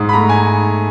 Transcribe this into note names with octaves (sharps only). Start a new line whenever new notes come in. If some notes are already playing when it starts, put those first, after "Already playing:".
Already playing: G#2
B5
A3 A#5
G#5